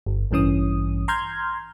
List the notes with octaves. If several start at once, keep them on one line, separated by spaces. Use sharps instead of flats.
G1
A1 G2 E3 C#4 D#6
A#5 C6 F6 G6 G#6